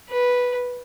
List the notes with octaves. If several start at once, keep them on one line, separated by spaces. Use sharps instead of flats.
B4